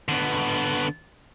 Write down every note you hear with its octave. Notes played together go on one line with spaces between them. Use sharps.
D3 B3